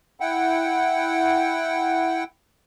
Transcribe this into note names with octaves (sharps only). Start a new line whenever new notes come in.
E4 F#5 G5